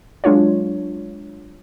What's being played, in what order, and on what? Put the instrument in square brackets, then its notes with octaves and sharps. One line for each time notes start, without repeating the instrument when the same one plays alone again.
[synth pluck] F#3 G#3 D4 F4 C#5